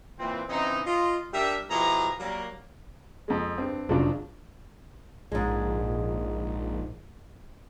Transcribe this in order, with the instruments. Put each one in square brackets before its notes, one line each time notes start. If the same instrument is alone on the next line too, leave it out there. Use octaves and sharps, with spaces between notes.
[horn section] A#2 E3 A#3 C4
C#3 E3 C4 D#4
F4 D#5
G3 D4 G4 A#4 E5
B2 F3 E4 G4 G#4 A#5
F#3 G3 A#3
[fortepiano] F2 G#3
G2 C4
[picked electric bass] F1 A2 D4 [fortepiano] C#3 F3 F#3
[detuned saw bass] A#1 [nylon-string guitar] G#2 G#3